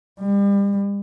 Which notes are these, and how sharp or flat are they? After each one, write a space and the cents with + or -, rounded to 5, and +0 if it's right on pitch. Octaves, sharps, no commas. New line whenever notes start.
G3 +35